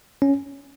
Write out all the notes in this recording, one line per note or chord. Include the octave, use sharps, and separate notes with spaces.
C#4